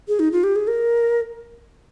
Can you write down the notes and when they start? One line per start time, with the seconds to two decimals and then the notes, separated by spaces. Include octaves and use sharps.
0.08 G#4
0.20 D#4
0.32 F4
0.44 G4
0.56 G#4
0.68 A#4